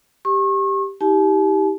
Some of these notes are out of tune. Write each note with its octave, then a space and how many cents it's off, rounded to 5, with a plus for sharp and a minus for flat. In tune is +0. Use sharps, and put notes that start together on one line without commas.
G4 +0 C#6 -35
E4 -45 G4 +0 A5 -45